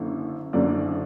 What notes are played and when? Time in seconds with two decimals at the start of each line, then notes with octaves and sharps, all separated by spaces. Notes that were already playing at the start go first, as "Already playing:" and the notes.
Already playing: F#1 F#2 D3
0.53 F#1 F#2 D3 F#3 D5